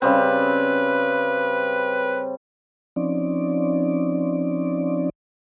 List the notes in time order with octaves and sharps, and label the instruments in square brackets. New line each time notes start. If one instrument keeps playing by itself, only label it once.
[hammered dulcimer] C#3 G3 C4 [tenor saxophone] B4
[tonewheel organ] F3 C4 C#4 D#4 D5